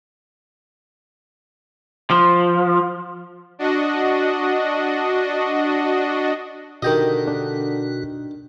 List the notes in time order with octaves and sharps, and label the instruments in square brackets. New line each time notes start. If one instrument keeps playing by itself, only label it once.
[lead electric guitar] F3
[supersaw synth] D4 F#4 D#5
[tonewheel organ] B2 F#4 [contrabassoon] D3 [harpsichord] D#3 G4 D#5
[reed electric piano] D4